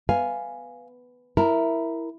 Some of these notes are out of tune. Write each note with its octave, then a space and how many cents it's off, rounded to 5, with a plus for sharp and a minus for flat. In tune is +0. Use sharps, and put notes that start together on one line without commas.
B3 +5 F5 +0 G#5 +0
E4 +0 A#4 +0 A5 +40